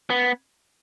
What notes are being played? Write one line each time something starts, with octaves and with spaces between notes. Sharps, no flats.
B3